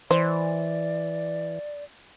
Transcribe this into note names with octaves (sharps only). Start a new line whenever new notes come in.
E3 C5 D5